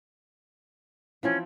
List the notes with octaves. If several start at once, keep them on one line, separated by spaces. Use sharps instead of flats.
E3 F3 C4 C#4